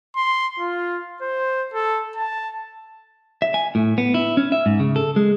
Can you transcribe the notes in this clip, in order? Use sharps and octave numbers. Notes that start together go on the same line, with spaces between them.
C6
F4
C5
A4
A5
E5
G#5
A2
B3
E4
C#4
E5
G#2
C#3
A4
G#3